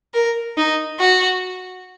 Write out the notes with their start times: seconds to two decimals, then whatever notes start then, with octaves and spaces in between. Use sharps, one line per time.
0.14 A#4
0.57 D#4
1.00 F#4